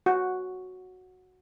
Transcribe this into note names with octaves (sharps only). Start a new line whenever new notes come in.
F#4